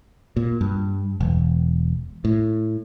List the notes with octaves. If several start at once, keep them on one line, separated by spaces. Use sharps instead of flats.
A#2
G2
E1
A2